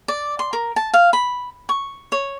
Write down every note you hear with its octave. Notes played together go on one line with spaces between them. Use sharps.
D5
C6
A#4
A5
F5
B5
C#6
C#5